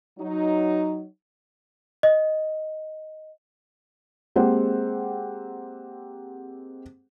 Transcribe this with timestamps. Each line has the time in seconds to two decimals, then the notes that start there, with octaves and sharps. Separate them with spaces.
0.19 F#3 D#4
2.03 D#5
4.36 G#3 A#3 C4 G4 C5 F#5